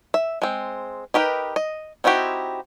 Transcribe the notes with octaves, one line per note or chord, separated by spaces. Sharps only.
E5
G#3 C4
D#4 G4 A#4 B4
D#5
C4 D#4 E4 F#4 G4